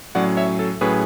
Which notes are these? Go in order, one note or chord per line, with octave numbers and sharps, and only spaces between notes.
A2 F#3 C#4 D5 F#5
C#5 E5
A4
A2 F#3 C#4 G#4 B4